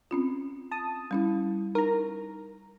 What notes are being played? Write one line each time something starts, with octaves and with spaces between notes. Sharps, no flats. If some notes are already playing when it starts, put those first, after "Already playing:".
C4 C#4 F4
A5 D#6
G3 C#4 E4
D#4 A#4 A#5